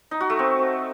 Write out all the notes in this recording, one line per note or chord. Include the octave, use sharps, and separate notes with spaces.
D#4
F#4
A3
C4